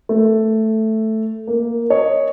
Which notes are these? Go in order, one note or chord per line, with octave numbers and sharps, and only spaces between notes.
A3
A#3
C#5 D#5